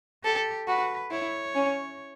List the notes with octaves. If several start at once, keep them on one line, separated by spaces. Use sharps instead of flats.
G4 A4
F#4 B4
E4 C#5
C#4